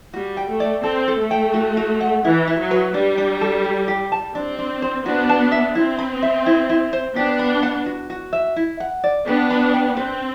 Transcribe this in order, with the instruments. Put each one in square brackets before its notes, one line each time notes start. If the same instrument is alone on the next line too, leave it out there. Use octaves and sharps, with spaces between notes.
[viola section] G3 [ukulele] F#4
[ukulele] G5
[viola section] A3
[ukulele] D5
[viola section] C4 [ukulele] A4
[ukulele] A4
[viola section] A3
[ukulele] G5
F#4
F#4
F#5
[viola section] E3 [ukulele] E4
[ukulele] E4
[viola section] F#3
[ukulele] B4
[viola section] G3 [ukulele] D4
[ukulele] D4
A4
G4
G4
A5
[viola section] C4 [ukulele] D4
[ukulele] D4
C5
[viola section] B3 D4 [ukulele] F#4
[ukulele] A5
E5
[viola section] C4 [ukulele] E4
[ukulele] B5
E5
E4
E4
C5
[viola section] B3 D4 [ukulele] G4
[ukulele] B5
F#5
F#4
F#4
E5
E4
F#5
D5
[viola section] B3 D4 [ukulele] G4
[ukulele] B5
G5
[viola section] C4 [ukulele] B4